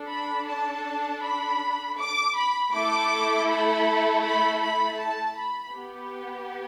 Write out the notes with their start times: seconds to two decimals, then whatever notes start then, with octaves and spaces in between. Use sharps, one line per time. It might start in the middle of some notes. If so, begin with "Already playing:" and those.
Already playing: D4 A4
0.09 B5
0.47 A5
1.22 B5
1.97 D6
2.35 B5
2.72 A3 E4 A4 D6
3.47 B5
4.22 B5
4.60 B5
4.97 A5
5.35 B5
5.73 B3 G4